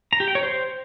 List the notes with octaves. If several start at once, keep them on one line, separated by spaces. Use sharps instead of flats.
A#5
G4
G5
C#5
C5